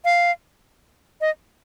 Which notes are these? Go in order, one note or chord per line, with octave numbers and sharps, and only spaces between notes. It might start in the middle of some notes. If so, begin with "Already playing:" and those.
F5
D#5